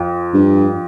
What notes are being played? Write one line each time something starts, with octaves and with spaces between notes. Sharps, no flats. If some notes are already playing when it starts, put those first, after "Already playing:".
Already playing: F2
G2